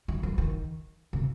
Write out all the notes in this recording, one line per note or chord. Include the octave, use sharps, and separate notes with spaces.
D#3
F3
D#3
C3